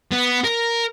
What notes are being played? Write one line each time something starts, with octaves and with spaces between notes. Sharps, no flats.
B3
A#4